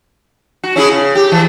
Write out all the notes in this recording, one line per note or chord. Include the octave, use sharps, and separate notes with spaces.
F#4
C#4 E4 G#4
C#3
G4
E3